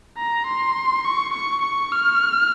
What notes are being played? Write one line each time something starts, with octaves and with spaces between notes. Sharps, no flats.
A#5
C6
C#6
C#6
C#6
F6